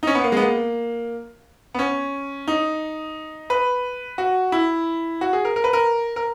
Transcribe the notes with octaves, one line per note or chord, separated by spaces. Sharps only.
D#4
C#4
B3
A#3
G#3
B3
A#3
B3
C#4
D#4
B4
F#4
E4
F#4
G#4
A#4
A#4
B4
A#4
A#4